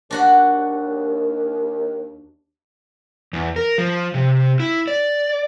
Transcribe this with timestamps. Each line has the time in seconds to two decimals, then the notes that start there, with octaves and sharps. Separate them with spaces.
0.11 D#2 D4 F#4 F#5
3.33 E2
3.56 A#4
3.78 F3
4.14 C3
4.60 E4
4.87 D5